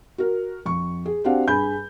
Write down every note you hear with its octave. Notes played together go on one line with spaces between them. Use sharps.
F#4 A#4
F2 C#6
G#4
C4 D4 F#4 G4 F5 F#5
G2 G#4 G#5 B5 G6